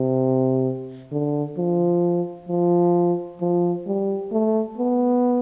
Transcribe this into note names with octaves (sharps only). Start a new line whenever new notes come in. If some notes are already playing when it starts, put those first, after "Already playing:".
Already playing: C3
D3
F3
F3
F3
G3
A3
B3